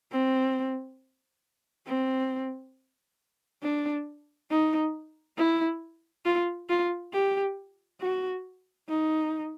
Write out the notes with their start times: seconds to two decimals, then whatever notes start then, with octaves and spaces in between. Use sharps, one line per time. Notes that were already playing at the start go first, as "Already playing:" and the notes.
0.11 C4
1.87 C4
3.63 D4
4.50 D#4
5.37 E4
6.26 F4
6.69 F4
7.13 G4
8.01 F#4
8.88 D#4